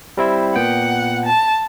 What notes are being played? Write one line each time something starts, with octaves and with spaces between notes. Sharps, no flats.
G3 C4 E4
A#2 B3 F#5 G5
A5